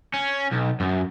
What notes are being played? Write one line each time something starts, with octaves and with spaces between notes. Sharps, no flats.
C#4
B1
F#2